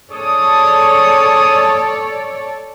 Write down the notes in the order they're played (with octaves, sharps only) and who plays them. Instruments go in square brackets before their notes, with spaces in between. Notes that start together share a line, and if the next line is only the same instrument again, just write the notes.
[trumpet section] D4 G#4 D#6 [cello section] A4 C#5 D5